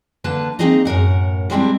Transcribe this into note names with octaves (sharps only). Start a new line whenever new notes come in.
D3 A#3 B4 A5
A#3 C4 D#4 G#4 D#5 A#5
F#2 A2 A#4 F#5
G3 G#3 C4 D4 E4